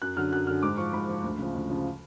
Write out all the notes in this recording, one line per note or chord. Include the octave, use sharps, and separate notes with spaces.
F#2 F#6
D3 F#3 F6
F#2 F#6
D3 F#3 F6
G#2 D6
F3 C#6
G#2 B5
F3
D2
C#3 F3
D2
C#3 F3